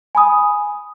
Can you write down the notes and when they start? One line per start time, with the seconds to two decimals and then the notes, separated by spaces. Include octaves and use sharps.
0.15 G#5 B5 D#6